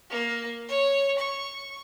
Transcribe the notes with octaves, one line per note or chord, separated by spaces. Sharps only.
A#3
C#5
C#6